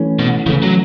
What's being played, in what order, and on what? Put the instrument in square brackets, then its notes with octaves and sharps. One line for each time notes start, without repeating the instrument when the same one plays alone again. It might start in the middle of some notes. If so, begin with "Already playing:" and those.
Already playing: [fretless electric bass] E3 A3 C#4
[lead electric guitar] B2
[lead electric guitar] C#3 [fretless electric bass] E3 A3 C#4
[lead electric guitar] F#3